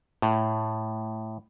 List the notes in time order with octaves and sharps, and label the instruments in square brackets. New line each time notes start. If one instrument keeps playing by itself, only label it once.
[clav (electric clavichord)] A2